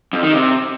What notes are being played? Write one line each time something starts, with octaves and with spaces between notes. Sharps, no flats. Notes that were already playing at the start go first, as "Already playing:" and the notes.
F2
D#3
C3